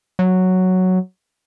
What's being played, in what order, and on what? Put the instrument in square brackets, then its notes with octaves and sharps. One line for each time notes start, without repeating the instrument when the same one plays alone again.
[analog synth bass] F#3